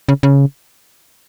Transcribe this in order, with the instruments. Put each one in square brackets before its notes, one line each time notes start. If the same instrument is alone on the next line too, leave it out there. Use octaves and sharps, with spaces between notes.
[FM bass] C#3
C#3